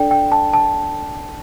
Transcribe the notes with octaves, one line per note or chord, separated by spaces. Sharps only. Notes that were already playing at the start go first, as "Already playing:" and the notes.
Already playing: D4 A4 D5 G5
G5
A5
A5